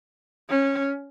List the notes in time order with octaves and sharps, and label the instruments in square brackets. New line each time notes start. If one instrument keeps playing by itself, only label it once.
[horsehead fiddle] C#4